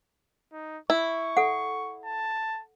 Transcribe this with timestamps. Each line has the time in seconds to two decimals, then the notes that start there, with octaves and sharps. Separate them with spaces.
0.53 D#4
0.90 E4 C#6
1.37 A4 F#5
2.05 A5